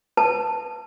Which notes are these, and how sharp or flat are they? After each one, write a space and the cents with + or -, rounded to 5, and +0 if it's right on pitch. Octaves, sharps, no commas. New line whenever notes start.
B4 +0 A5 +0